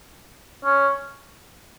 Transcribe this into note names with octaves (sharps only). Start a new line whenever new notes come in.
C#4